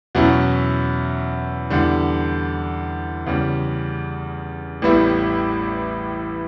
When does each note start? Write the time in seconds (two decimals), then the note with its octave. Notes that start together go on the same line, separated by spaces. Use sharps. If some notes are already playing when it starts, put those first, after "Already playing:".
0.15 E2 B2 F#3 C#4 E4
1.70 E2 D3 G3
3.26 E2 C#3 G3
4.82 A1 A2 G3 B3 E4